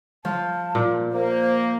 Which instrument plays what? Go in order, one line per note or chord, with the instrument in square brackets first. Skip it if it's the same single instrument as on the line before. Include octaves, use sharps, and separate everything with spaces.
[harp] F3 [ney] A5
[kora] A#2
[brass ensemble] A#3 [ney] C5